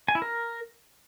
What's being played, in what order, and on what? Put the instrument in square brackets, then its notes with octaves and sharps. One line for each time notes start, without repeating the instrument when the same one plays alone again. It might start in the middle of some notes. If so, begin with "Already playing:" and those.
[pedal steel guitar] G#5
E4
A#4